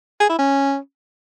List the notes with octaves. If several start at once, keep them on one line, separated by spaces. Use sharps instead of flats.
G#4
E4
C#4